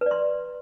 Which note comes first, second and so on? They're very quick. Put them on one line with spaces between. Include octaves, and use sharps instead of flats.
B4 D5 C6